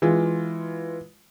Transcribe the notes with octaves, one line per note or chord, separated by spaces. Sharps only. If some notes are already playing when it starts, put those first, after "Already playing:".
E3 G#3 F4